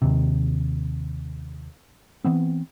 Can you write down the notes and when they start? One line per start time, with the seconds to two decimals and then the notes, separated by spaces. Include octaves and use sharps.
0.02 D#2 C3
2.24 E3 B3 C4